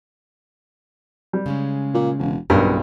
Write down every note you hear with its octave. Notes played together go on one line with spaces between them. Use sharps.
G3
C#3 G#3 C#4
A#2
E1
F#1 B1 G2 B3 A#4